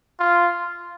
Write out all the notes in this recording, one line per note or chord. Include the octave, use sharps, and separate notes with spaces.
F4